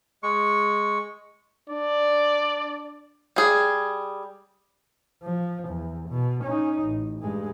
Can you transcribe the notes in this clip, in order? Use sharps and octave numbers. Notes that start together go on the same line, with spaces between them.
G#3 C#6
D4 D5
G3 G#4
F3
E2
B2
C#4 D#4
A1
G2 G#3